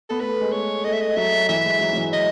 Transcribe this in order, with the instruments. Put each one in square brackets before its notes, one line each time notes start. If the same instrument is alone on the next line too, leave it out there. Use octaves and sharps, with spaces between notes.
[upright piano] B3 [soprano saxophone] A4
[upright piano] A3 [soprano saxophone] B4
[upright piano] G#3
[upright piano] A3 [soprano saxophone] C#5
[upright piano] A3 [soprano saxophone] D#5
[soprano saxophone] E5
D#5
[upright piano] F#3 [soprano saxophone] E5
[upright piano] E3 [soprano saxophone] E5
[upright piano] G#3
F#3
F#3
E3
[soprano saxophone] D#5